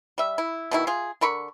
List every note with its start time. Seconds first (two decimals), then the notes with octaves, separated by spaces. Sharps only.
0.18 G3 E5
0.38 E4
0.71 B2 D#3 E4
0.87 F4 G#4
1.21 D3 A#4 B5 C#6